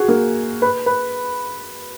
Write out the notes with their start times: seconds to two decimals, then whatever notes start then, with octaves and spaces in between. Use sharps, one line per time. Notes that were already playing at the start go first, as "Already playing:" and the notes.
Already playing: F#4 G#4
0.08 A#3
0.62 B4
0.86 B4